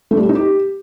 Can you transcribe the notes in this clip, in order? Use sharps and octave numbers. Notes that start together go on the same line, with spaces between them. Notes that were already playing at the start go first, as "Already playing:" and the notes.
A3
G3
G4
D#4
G4